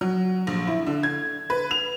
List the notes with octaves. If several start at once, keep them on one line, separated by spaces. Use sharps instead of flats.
F#3
A#1
E4
D3
G#6
B4
F7